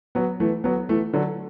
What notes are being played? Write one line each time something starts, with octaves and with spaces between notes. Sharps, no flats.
F#3 B3
E3 A3
F#3 B3
E3 A3
D3 F#3